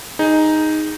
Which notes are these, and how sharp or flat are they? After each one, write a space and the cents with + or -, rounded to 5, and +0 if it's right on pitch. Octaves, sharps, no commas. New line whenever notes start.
D#4 +0 G#4 +0